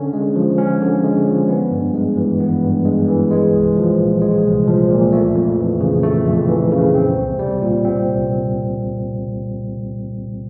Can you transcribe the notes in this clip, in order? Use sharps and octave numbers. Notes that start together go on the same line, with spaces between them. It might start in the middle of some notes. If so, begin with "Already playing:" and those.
Already playing: D3 C#4
G#3
F3
C#4
D3
G#3
F3
B3
G2
G#3
E3
B3
G2
G#3
E3
G#3
C2
F3
A#2
G#3
C2
F3
A#2
A3
F2
E3
C#3
A3
F2
E3
C#3
C4
C2
G3
A#2
C4
C2